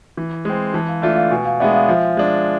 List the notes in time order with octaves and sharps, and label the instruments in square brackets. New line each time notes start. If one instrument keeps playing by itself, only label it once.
[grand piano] E3
G#3 C4
[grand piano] E3 [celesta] A5
[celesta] F5
[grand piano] A3 D4 F4 [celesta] E5
[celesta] F5
[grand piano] B2 [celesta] G#5
[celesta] F5
[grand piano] G#3 B3 D4 [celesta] E5
[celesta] F5
[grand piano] F3 [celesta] E5
[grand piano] G#3 D4